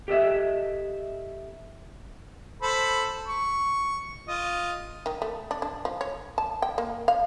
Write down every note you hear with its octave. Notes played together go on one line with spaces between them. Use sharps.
G4 A4 D#5 E5
A4 C5 B5
C#6
F4 D#5
D#3
A3
D4
D4
F3
C#5
A5
G5
A#3
F5